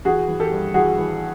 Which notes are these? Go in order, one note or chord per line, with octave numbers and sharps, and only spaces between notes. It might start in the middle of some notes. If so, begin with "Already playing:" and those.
E3 F#4 G#4
E3
G4 A4
G2
E3 F#4 G#4
E3